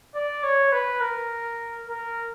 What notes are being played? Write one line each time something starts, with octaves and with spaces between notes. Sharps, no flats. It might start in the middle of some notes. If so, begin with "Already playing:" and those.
D5
C#5
B4
A#4
A#4